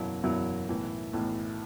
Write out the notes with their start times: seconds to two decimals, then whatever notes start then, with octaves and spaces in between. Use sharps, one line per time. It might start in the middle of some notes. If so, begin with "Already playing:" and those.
Already playing: F#1 E2 B2 F#3 E4
0.23 F#1 E2 B2 F#3 E4
0.69 B1 A2 E3
1.13 B1 A2 E3